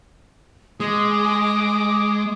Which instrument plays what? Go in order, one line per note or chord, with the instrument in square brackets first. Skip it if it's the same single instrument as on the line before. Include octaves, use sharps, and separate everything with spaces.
[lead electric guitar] G#3 [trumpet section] D6 [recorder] D#6